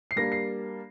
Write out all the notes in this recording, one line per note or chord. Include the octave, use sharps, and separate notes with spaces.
C7
G3 A#3 D4 A#6
C7